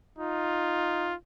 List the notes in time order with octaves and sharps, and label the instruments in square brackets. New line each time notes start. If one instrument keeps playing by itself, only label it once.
[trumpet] D#4 [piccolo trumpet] F4